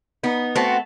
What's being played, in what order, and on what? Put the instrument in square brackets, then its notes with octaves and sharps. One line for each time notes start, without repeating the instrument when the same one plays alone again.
[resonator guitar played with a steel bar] B3 D#4
[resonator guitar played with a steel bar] A3 A5 [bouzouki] B3 C4 F#4